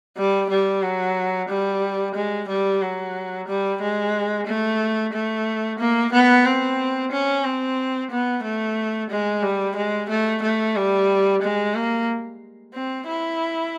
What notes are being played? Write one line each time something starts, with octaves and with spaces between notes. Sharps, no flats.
G3
G3
F#3
G3
G#3
G3
F#3
G3
G#3
A3
A3
A#3
B3
C4
C#4
C4
B3
A3
G#3
G3
G#3
A3
A3
G3
G#3
A#3
C4
E4